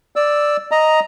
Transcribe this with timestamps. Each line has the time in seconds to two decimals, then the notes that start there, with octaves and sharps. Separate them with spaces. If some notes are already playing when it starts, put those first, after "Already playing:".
0.16 D5 E6
0.72 D#5 A#5